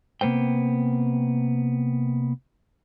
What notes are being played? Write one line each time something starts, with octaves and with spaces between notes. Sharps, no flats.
C3 A#3 B3 C5 G5